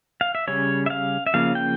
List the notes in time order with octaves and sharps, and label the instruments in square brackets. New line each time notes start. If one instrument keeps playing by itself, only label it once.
[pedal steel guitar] F5
E5
C#3 G3 C#4 C#5
E5
F5
E5
C#3 F3 A#3 C#4 F5
G5